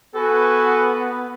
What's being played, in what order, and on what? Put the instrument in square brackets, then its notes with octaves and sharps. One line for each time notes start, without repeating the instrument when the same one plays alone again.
[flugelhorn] B3 [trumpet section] F#4 B4 G#5 [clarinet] A4